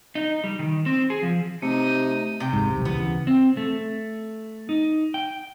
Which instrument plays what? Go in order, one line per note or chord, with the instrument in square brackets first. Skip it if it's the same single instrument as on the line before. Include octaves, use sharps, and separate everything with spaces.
[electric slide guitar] D#4
G3
D#3
C4
G#4
F3
[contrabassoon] C3 [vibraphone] A3 [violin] D#4 D#7
[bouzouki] C3 G5
[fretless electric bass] D1 G#1 G#2
D#1 B1
[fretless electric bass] D2 C#3 E3 [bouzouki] B3
[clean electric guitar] C4
A3
D#4
G5